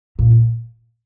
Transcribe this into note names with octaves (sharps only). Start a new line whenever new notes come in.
A#2